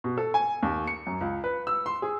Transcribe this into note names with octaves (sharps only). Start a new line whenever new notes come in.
B2
A4
G#5
D#2
C#7
F#2
C#2
B4
E6
C6
G#4